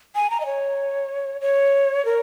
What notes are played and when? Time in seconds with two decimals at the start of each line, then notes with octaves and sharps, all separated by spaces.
0.15 G#5
0.30 A#5
0.40 D#5
0.46 C#5
1.41 C#5
2.05 A#4